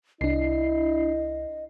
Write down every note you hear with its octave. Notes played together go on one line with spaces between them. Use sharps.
C2 D4 E4 D#5 C7